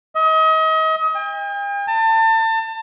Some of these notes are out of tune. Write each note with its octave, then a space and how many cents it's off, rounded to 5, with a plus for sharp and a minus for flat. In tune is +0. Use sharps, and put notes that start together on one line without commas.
D#5 +35
G5 +45
A5 +30